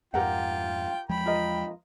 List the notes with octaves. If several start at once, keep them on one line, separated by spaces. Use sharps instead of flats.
F2 G#2 F4 G4 A#4 F#5 G5
E2 F3 G#3 G5 B5
F4 A#4 D#5